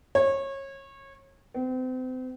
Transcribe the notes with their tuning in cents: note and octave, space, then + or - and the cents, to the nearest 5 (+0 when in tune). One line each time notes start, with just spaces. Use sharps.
C#5 -25
C4 -35